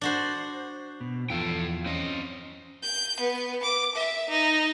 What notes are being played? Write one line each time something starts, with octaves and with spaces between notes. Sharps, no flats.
D4 F#4 C5
B2
E2 F3 F4 A4 G5
C4 C#4 D#5
G6
B3
D6
E5
D#4